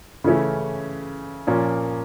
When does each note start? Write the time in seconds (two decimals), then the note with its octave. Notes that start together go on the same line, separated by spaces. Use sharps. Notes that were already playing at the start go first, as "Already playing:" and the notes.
0.24 C#3 E3 A3 C#4 E4
1.47 A#2 F3 A#3 C#4